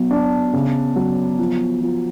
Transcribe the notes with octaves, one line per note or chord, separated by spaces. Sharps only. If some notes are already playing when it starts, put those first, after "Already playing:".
Already playing: F#3 B3
D4
C#3
F#3
F3
F3